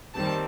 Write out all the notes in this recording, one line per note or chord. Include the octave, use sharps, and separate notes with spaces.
D#2 D#3 G3 C4 A5